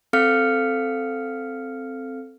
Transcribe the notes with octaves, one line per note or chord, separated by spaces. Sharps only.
C4 A4 F5 F6 C#7